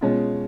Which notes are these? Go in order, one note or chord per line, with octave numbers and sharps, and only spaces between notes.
B2 G#3 C#4 F4